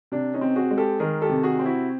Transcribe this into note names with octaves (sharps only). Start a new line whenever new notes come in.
C3 D4
C#4 D#4
C4
F#4 G#4
G#3
G4 A4
D#3 G#4 A#4
G4 A4
C3
F#4 G#4
C4
E4 F#4